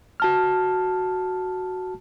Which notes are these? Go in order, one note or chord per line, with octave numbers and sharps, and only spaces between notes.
F#4 A5 F6